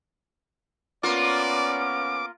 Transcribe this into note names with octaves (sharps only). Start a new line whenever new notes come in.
A#3 B3 C#4 F4 D5 D6